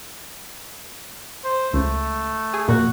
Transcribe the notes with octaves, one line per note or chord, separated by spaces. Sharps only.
C5
C#2 A3
G#4
F2 A#2 F#4